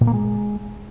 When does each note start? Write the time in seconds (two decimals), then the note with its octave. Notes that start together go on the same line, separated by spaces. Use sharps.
0.01 A#2
0.07 A#3
0.13 G#3